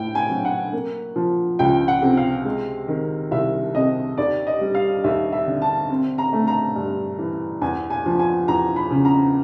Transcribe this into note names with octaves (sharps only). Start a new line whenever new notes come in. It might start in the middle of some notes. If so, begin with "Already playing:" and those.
Already playing: A2 G5
G#5
F#3
F#5
A#3
F3
C#2 G5
F#5
C3
F5
G#3
D#3
C2 E5
C3 D#5
D#2 D5
D#5
G3
F5
D#2 E5
E5
D3
A5
C4
A#5
A3
A#5
G2
E3
E2 G#5
G#5
F3
G#5
E2 A#5
B5
C#3
A#5